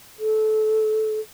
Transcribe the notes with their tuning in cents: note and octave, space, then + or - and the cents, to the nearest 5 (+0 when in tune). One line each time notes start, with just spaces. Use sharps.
A4 -20